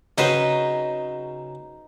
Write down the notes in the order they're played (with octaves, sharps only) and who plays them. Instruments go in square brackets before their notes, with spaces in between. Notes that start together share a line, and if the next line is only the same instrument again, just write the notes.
[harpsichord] C#3 F#3 C#4 [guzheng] D#4 B4 C5